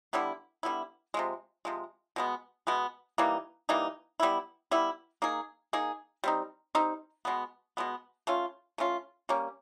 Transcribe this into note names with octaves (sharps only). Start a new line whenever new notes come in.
D3 G3 B3 E4
D3 G3 B3 E4
C3 F3 G#3
C3 F3 G#3
B2 G#3 B3
B2 G#3 B3
E3 G3 A#3 D#4
E3 G3 A#3 D#4
G3 B3 E4
G3 B3 E4
A#3 D#4 G#4
A#3 D#4 G#4
G3 C4 D#4
G3 C4 D#4
B2 G#3 B3
B2 G#3 B3
A3 C#4 F4
A3 C#4 F4
G3 A#3 C#4